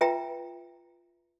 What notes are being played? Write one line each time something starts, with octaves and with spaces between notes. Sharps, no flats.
F4 B4 E5 G5 A#5